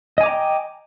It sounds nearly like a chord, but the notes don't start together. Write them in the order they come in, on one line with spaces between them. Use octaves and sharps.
D#5 G#5 D6 A#5 G5